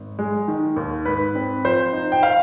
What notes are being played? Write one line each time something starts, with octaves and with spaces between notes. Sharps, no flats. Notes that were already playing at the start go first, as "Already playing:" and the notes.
Already playing: G#1
G#3
D#3
D#2
G#2 B4
C4
F3 C5
D#4
G5
F5